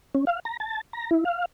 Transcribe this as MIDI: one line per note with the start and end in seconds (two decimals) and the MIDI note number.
0.15 0.25 61
0.27 0.40 77
0.45 0.57 82
0.60 0.81 81
0.93 1.10 82
1.11 1.24 64
1.25 1.45 77